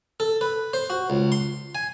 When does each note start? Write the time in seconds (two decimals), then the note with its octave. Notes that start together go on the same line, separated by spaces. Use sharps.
0.20 A4
0.41 B4
0.74 C5
0.90 F#4
1.10 C#2
1.32 C6
1.75 G#5